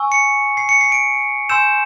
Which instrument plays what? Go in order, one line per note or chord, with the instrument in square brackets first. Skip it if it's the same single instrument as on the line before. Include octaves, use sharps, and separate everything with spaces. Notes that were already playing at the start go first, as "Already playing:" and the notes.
Already playing: [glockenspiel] G#5 C#6 E6
C#7
C7
C#7
C7
D7
G#5 C6 E6 G6 E7